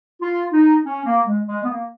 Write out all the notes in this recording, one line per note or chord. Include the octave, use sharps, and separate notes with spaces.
F4
D#4
C#4
A#3
G#3
G#3
B3
A#3